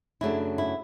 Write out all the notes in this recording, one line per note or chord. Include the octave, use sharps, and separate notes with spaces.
F#2 C#3 F#3 A3 D4 E4
E4